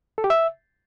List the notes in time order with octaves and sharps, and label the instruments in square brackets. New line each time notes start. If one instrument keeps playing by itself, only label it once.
[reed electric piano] A4
G4
E5